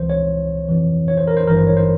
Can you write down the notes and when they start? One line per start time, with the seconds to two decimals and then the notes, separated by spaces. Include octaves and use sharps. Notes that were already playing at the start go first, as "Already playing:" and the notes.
Already playing: C#2 C3 E3 C5
0.10 C#5
0.69 F2 C3 E3
1.08 C#5
1.17 C5
1.27 A#4
1.37 C5
1.47 G#1 G2 E3 A#4
1.57 C5
1.67 C#5
1.77 C5